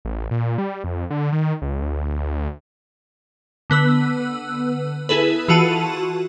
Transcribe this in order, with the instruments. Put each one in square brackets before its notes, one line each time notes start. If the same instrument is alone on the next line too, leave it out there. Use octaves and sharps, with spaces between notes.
[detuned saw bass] A1
A#2
G3
F2
D3
D#3
C#2
D2
[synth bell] D3 B3 B4 E6
E4 G#4 A4 B4
E3 F4 F#4 A5 D#7